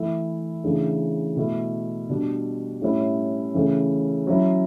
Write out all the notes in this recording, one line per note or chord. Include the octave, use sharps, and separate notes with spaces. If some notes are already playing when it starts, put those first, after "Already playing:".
Already playing: E3 A3 E4
C#3 E3 A3 D4
B2 A3 E4
B2 G3 D4
A2 G3 C#4 E4
C#3 E3 A3 C#4
F#3 C#4 E4